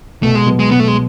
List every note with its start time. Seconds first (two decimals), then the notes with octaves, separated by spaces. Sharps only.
0.23 B2 A3
0.35 G#3
0.47 F#3 B3
0.59 G#3
0.71 B2 B3
0.80 A3
0.88 G#3